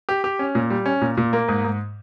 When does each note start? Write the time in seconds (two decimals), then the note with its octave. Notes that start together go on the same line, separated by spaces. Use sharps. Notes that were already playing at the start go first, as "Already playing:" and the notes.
0.09 G4
0.24 G4
0.39 C#4
0.55 A#2
0.70 G3
0.86 C#4
1.02 A#2
1.17 A#2
1.33 A#3
1.48 G#2
1.64 G#2